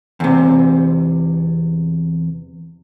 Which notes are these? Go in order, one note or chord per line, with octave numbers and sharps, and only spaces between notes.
E2 C3